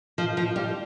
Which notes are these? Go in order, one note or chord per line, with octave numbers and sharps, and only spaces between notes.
F3
F3
G3